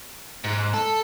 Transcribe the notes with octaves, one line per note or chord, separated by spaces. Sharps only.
G#2
A4